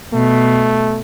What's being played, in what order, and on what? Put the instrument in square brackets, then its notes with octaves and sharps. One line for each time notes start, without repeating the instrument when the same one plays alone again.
[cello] B2 [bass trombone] A3